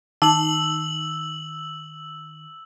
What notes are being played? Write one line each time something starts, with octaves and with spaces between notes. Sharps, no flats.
D#3 D#4 A5 D6 E6 F#7